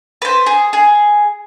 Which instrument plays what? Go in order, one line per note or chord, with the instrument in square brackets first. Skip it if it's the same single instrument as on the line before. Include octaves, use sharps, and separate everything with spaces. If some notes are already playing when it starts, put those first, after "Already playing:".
[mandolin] B4 C5
G#4
G#4